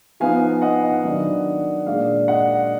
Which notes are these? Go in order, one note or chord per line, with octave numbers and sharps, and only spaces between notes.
F3 B3 D#4 F5 G#5
D#5 F#5
D#5 F#5
D#3 F#3 D4
A#2 G#3 D4 D5 F5
D#5 F#5